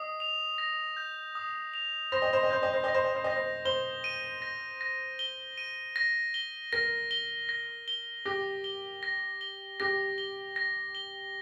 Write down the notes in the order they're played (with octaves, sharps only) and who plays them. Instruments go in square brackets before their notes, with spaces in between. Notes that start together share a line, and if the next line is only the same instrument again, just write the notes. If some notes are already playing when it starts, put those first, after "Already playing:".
Already playing: [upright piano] D#5 [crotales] D#6
[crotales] F7
A#6
G6
D#6
F7
[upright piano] C5 [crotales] A#6
[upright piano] D#5
C5
D#5
[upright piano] C5 [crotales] G6
[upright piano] D#5
C5
[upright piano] D#5 [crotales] A#6
[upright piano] C5
D#5
C5
[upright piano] D#5 [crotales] A#6
[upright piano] C5
[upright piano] C5 [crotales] G7
[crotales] D#7
A#6
A#6
G7
D#7
A#6
G7
[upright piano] A#4 [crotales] A#6
[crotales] G7
A#6
G7
[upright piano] G4 [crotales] A#6
[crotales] G7
A#6
G7
[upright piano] G4 [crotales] A#6
[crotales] G7
A#6
G7